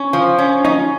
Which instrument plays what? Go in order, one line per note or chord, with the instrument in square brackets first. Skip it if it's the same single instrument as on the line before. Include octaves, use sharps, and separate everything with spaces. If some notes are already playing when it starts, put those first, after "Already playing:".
Already playing: [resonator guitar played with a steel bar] C#4
F3
C#4
[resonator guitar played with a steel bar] C#4 [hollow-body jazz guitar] D#4